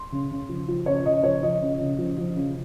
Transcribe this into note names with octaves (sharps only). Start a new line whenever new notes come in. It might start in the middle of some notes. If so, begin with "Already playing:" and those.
Already playing: C6
C#3
C#3
F3
F3
C#3 C#5
C#3 D#5
F3 C#5
F3 D#5
C#3
C#3
F3
F3
C#3